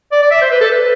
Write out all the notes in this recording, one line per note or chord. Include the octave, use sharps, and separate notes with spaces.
D5
D5
E5
C5
B4
A4
B4